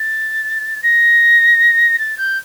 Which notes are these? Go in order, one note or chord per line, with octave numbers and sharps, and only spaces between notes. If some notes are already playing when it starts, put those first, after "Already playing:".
Already playing: A6
A#6
A6
G6